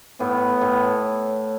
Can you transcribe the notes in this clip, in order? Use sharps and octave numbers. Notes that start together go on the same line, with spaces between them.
A2 B3
A2